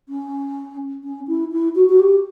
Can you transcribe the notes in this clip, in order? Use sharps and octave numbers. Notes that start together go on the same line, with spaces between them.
C#4
C#4
E4
E4
F#4
F#4
G4